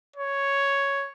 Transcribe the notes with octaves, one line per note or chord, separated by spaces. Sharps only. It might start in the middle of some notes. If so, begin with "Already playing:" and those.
C#5